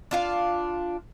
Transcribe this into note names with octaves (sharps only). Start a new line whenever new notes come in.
D4 F4 F5